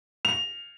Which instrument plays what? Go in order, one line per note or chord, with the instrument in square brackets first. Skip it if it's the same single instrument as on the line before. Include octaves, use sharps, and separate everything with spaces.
[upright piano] F7